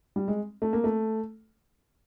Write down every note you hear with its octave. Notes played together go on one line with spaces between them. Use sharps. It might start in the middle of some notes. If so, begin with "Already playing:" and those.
G3
G#3
A3
A#3
A3